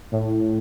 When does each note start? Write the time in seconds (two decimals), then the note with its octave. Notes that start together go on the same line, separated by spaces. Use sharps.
0.12 A2